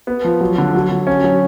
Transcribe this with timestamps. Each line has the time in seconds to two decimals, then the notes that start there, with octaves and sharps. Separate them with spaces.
0.07 B3
0.25 F3
0.41 F#3
0.58 D3
0.75 F#3
0.91 D3
1.07 C#4
1.24 F#3